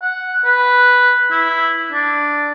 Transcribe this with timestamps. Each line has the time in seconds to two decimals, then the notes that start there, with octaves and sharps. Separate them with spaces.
0.02 F#5
0.45 B4
1.31 E4
1.92 D4